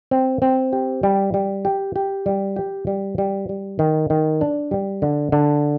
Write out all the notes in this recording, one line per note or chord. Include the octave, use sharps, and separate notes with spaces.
C4
C4
G4
G3
G3
G4
G4
G3
G4
G3
G3
G3
D#3
D#3
D4
G3
D3
D3